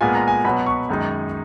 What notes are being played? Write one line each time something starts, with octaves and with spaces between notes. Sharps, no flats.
A#2 G#3 B3 F4 G#5
A#5
G#5
B2 F#3 B3 B5
C#6
F#2 D#3 G#3 D#4